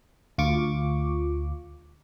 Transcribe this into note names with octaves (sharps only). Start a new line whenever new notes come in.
D2 F4 C#6 D6